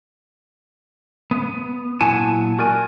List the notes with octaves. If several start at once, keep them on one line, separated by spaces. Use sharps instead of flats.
B3
A#2 F#3 E4 F#5 G#5 A5
F#4 A#4 D5 G#5